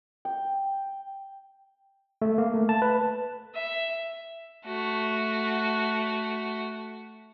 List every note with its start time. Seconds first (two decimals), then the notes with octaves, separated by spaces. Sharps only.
0.25 G5
2.22 A3
2.38 A#3
2.54 A3
2.69 A5
2.82 B4
3.54 E5
4.65 A3 F#4